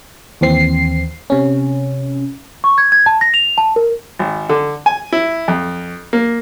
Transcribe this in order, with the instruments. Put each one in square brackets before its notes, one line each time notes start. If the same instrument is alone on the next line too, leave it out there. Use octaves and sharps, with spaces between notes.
[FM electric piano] D#2 E3 C4 C7
C3 C#4
[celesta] C#6
G#6
G#6
A5
A#6
F7
A5
A#4
[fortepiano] G#1
D3
G#5
E4
F2
A#3